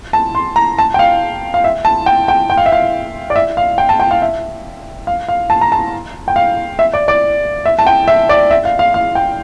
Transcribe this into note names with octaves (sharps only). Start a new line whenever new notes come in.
A5
C6
A#5
A5
G5
F5
F5
E5
A5
G5
G5
G5
F5
E5
F5
D5
E5
F5
G5
A5
G5
F5
E5
F5
F5
A5
A#5
A5
G5
F5
E5
D5
D5
E5
A5
G5
E5
D5
E5
F5
F5
F5
G5